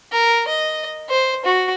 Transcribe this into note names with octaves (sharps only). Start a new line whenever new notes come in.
A#4
D#5
C5
F#4